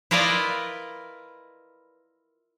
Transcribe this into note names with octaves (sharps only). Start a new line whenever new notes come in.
E4 F4 A#4 B4 D5 D#5